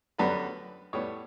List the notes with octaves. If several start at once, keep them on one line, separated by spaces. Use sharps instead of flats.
F#2 D3 G3 B3 B4
A2 G3 B3 C#5